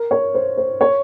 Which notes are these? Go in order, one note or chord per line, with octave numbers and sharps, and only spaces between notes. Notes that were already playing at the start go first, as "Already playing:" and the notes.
Already playing: A#4
C#5
C5
C5
C#5